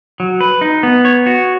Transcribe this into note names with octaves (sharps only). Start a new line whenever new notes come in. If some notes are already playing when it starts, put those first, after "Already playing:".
F#3
B4
D#4
B3
C#5
F#4